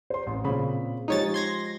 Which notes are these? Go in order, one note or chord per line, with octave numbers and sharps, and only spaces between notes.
C5 C6
A1 C4
A#2 C#3 C4 B5
F3 G#3 D#4 G4 C#5 A6
C6 G#6 A#6